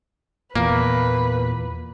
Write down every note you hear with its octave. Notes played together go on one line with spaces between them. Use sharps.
E2 A#2 A#3 B4